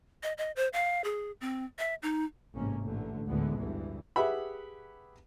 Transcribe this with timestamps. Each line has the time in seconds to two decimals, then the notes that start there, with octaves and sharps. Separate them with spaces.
0.23 D#5
0.38 D#5
0.56 C5
0.73 F5
1.04 G#4
1.41 C4
1.79 E5
2.03 D#4
2.54 A1 G#2 C3 A#3 C#4
2.85 A1 A#2 D3 A3
3.28 A1 D2 D3 E3 G#3 B3
3.57 D2 G2 E3
4.16 G4 G#4 B4 E5 F#5 B5